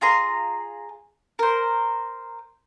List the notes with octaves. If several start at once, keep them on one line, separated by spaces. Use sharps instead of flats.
F4 G#4 A#5 C6
A#4 C5